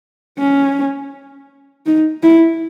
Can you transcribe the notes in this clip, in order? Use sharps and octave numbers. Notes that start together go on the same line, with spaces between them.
C#4
D#4
E4